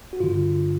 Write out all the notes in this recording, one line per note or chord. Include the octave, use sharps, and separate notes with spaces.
F#4
G2 D3 F4